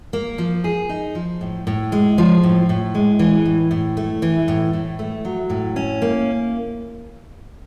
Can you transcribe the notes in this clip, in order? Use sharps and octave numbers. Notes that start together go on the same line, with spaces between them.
A#3
F3
G#4
D#4
F3
A2
A2
G#3
F3
A2
A2
G#3
E3
A2
A2
A3
E3
A2
A2
A3
F#3
A2
C#4
A#3